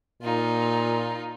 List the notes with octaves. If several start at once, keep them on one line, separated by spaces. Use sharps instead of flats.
A#2 D#4 F4